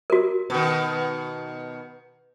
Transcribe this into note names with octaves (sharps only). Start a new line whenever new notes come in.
F#4 A#4
B2 D#3